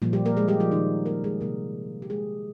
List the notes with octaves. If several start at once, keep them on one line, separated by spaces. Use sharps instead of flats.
A#2 F3 G3 A#3 F4
G3 G4
A#3 A#4
G#3 G#4
G3 G4
F3 F4
D#3 D#4
A#3 A#4
G#3 G#4
C3 D#3 G#3 A#3 A#4
G4
G#3 G#4